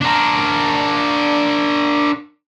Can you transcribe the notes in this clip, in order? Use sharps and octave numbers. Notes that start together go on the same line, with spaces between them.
D4 A#4